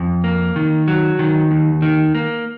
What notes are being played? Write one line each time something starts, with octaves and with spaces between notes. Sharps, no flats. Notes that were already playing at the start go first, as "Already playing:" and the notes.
Already playing: F2
A#3
D#3
F#3
D#3
D#2
D#3
A#3